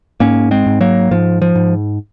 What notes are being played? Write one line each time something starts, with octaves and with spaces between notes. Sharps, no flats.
G#2 A#3 C#4
G#3 C4
G#2
F#3 A#3
G#2 F3
F3
G#2